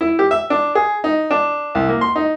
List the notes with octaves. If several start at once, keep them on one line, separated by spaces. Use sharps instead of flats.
E4
G4
E5
D4
G#4
D#4
D4
C2
A#3
C6
D#4